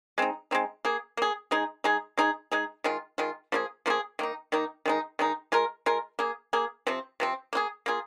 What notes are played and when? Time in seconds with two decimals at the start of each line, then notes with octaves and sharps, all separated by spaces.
0.18 G#3 C4 D#4
0.51 G#3 C4 D#4
0.85 A#3 G#4
1.17 A#3 G#4
1.51 G#3 D#4 G#4
1.84 G#3 D#4 G#4
2.17 G#3 D#4 G#4
2.52 G#3 D#4 G#4
2.84 D#3 G#3 F4
3.18 D#3 G#3 F4
3.52 F3 A#3 F4 G#4
3.86 F3 A#3 F4
3.90 G#4
4.19 D#3 A#3 D#4
4.52 D#3 A#3 D#4
4.86 D#3 G#3 D#4
5.19 D#3 G#3 D#4
5.52 G#3 F4 A#4
5.86 G#3 F4 A#4
6.19 A#3 G#4
6.53 A#3 G#4
6.87 C3 F3 C4
7.20 C3 F3 C4
7.53 A#3 F4 G#4
7.86 A#3 F4 G#4